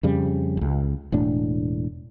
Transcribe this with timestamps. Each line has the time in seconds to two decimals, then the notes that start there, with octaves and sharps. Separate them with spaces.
0.03 F2 C#3 G3
0.57 E1 C#2
1.12 E1 A2 D4